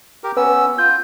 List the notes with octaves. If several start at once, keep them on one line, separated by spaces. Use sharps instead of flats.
G4 A#4
B3 C#4 B4 E6
F4 G6